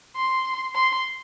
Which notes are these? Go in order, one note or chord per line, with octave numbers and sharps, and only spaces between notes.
C6
C6